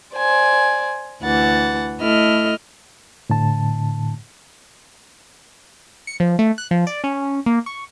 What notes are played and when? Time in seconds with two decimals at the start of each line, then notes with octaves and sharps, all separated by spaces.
0.14 C5 D5 G#5
1.22 D2 E3 F#5 A6
2.00 A3 E4 A4 D#5 F6
3.30 A2 D3 A5
6.07 C#7
6.20 F3
6.39 A3
6.58 F#6
6.71 F3
6.87 D5
7.04 C#4
7.46 A#3
7.66 C#6